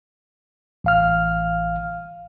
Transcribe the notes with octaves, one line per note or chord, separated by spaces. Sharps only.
A1 F5 F6